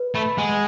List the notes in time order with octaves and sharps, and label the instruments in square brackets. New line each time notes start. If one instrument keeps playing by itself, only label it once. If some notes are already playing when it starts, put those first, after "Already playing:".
Already playing: [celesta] B4
[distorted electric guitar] A3 [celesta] B5
[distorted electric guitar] G#3 [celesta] F#5